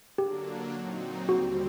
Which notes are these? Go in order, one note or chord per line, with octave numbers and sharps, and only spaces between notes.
D3 F#3 A#3 D4 G4
A#2 F#3 C4 D#4
D#2 D3 G3 C4 F#4